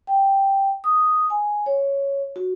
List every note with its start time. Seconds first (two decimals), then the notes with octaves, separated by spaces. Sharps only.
0.07 G5
0.84 D#6
1.30 G#5
1.66 C#5
2.36 F#4